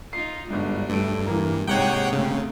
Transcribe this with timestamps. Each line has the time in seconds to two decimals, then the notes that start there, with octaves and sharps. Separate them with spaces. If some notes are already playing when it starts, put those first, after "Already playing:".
0.13 D#4 F4 C7
0.51 G1 G#2 F#3 G3 D4
0.90 G2 A3 D7
1.26 E3 A#3
1.68 D#2 G#2 C3 D#4 G#4 C#5 F#5 G5
2.12 C#3 A3 C4